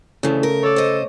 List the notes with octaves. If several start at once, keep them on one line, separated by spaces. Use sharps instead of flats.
D2 C#3 E3 A3 A4
A#4
A4 C#5 D5
C5 D#5